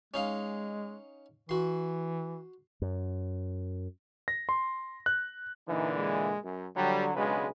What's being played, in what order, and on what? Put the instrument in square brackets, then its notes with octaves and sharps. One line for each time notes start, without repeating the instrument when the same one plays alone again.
[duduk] G#3 [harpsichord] C#4 D#4 F5
[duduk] E3 [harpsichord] F#4 C6
[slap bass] F#2
[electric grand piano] A#6
C6
F#6
[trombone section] A#2 D3 E3 [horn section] D#4
[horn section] G#3
F#2
[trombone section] D3 F#3 [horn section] G3
[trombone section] B1 C#3 G#3 [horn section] D4 F#4 B4